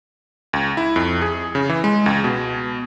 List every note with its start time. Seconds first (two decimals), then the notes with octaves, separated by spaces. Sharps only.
0.53 C#2
0.77 E4
0.96 F2
1.22 G#4
1.55 C#3
1.69 E3
1.84 G#3
2.06 C#2
2.24 B2